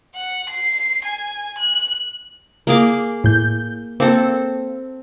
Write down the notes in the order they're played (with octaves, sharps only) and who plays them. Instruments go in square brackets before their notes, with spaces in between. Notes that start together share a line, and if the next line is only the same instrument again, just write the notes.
[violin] F#5
C7
G#5
F#6
[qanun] A#3 G#4 D6
[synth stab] A2 G6
[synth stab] A#3 [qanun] C4 A4